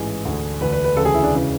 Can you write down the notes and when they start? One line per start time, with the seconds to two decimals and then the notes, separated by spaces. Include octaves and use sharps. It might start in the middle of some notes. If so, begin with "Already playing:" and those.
Already playing: A1 G#2 E3 G#4
0.25 D2 D3
0.61 E1 D2 D3 B4
0.73 B4
0.84 B4
0.96 E1 D2 C#3 A4
1.05 G#4
1.14 E4
1.23 D4
1.32 E1 C#3 E3